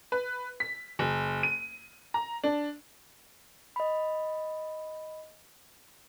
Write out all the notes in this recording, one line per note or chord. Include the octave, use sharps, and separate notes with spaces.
B4
B6
F#1
D#7
A#5
D4
D#5 B5